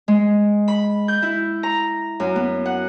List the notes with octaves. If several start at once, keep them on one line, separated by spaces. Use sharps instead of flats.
G#3
B5
G6
E4
A#5
F#2
B3
F#5